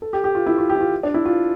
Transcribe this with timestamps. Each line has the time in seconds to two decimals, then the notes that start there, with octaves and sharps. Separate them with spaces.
0.02 A4
0.13 G4
0.24 G4
0.35 F4
0.46 E4
0.58 F4
0.69 G4
0.75 E4
0.81 F4
1.03 D4
1.14 E4
1.25 F4